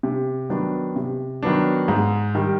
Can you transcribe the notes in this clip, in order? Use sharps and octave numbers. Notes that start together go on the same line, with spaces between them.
C3
D#3 F#3 B3 D4
C3
D#3 F#3 B3 D4
G#2
D#3 G3